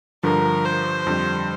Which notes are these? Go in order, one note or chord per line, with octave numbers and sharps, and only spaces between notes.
G2 D3 F3 A#4
C5
F2 D3 G3